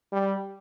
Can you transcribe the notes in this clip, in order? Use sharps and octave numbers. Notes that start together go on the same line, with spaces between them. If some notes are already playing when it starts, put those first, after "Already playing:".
G3